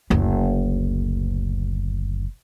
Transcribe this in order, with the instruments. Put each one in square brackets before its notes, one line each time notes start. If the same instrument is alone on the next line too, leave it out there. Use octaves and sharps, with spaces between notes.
[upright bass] F#1 D2